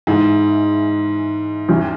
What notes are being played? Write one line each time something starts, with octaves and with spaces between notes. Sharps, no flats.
G#2 E3 G#3 E4
E2 E3 G3 C#4